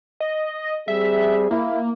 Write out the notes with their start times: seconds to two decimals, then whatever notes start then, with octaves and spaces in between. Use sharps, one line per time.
0.20 D#5
0.88 G3 C4 G#4 E5
1.51 A#3 E4